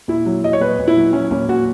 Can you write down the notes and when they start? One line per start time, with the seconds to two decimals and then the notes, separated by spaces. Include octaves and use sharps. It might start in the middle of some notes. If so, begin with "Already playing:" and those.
0.08 A#2 E4
0.26 F#3
0.43 F#3 D#5
0.53 C#5
0.61 A#2 B4
0.79 A#2
0.88 E4
0.96 F#3
1.13 F#3 C#4
1.31 A#2 C#4
1.48 A#2 F#4